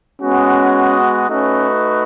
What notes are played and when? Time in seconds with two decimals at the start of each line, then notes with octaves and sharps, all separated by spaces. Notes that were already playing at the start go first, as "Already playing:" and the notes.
0.22 G#3 B3 C#4 F#4
1.29 A3 C#4 D#4 F#4 B4